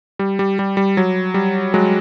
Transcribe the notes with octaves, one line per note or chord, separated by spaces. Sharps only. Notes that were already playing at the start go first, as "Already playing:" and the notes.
G3
G3
G3
G3
F#3
G3
F#3 G#3